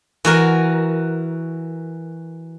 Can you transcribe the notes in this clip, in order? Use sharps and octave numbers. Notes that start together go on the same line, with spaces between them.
E3 F#4 A#4